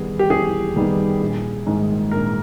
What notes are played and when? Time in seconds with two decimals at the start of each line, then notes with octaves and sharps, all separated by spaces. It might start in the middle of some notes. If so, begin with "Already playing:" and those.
Already playing: E2 D#3 G3 B3 D#4 G#4
0.19 G4
0.30 E2 G#4
0.76 D#3 G3 B3 D#4
1.21 A#1
1.66 G#2 D#3 G#3
2.11 A#1 A#4